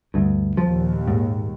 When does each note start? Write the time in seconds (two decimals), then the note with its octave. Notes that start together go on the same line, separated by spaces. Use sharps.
0.14 D2 G2
0.57 D#2 A#2 F3
1.08 G#2